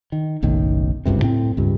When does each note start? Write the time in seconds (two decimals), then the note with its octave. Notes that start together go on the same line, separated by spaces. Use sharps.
0.12 D#3
0.42 F#1 B1 A2 D#3
1.06 F#1 C#2 G2 C3
1.22 A2 C4
1.57 C#2 G2